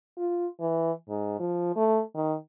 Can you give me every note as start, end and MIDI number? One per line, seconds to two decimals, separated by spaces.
0.18 0.47 65
0.60 0.92 52
1.09 1.38 44
1.39 1.72 53
1.76 2.01 57
2.15 2.35 51